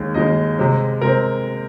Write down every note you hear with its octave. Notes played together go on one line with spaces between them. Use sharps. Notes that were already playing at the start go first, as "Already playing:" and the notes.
Already playing: D#2 D#3 G#3
D#2 D#3 G#3 D#5
C3 G#3 C4
C3 G#3 C4 A#4